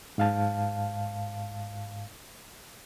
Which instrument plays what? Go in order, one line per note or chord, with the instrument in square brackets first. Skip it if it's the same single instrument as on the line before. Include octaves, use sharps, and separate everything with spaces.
[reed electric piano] G#2 F5 A5